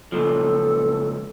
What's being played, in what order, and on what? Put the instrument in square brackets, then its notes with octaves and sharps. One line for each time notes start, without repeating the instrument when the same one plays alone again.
[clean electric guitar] C#2 A#2 F3 [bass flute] A4